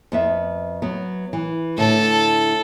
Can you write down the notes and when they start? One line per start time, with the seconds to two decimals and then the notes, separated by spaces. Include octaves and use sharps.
0.12 F2 B3 E5
0.82 F#3 B3
1.33 E3
1.78 A2 D3 A4